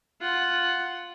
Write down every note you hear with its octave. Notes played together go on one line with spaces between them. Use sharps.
F4 F#5